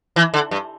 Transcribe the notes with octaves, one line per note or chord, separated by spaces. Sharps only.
E3
D3
G2